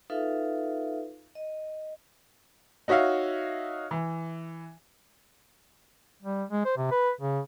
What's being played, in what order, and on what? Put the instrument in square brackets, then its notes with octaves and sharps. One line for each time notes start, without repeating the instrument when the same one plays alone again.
[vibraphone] D#4 F4 A4 B4 E5 F5
D#5
[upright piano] D#4 F#4 C#5 E5 F5
E3
[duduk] G3
G#3
C5
C3
B4
C#3